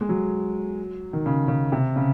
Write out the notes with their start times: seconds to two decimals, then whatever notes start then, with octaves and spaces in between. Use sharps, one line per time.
0.01 G#3
0.09 F#3
1.13 D#3
1.26 C#3
1.48 C#3
1.72 C3
1.96 C#3